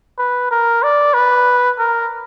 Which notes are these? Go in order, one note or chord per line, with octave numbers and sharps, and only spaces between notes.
B4
A#4
D5
B4
A#4